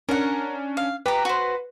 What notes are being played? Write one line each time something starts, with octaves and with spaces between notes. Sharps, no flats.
C#4 D4 A#4 F#5
F5
G4 B4 A#5
F#4 C5